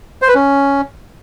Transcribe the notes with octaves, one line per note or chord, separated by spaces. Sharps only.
C5
B4
C#4